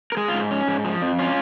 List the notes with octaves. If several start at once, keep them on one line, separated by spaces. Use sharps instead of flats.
A#4
G#3 G#4
F4
G#2
C#4
G#2
F3
F2
C#4 F4